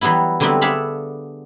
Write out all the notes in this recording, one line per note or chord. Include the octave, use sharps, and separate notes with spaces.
E3 F#3 G3 B3 E4
D3 F#3 G3 B3 C4 E4
D4 G#4 A4 E5 F5 B5